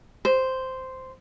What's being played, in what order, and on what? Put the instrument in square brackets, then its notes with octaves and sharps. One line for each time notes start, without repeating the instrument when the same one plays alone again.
[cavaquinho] C5